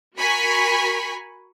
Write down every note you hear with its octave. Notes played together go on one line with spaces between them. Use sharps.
F#4 A#4 G#5 B5 C#6 B6